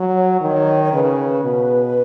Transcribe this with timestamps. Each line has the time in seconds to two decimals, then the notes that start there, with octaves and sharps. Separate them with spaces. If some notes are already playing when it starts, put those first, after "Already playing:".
Already playing: F#3
0.15 C#5
0.41 D#3 C#5
0.84 C#5
0.93 C#3 B4
1.43 B2